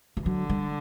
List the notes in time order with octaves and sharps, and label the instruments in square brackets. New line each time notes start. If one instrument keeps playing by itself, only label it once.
[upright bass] E3
[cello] D3 [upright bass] F#3
[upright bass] G3